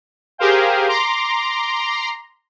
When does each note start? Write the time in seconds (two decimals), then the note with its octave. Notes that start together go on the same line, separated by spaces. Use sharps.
0.38 G4 G#4 A#4 C5 F5 G5
0.88 A#5 C6 D6